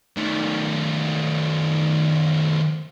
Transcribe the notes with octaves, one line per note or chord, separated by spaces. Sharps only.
D#3 A3